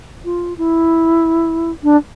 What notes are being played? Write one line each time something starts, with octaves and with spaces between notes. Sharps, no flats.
F4
E4
D4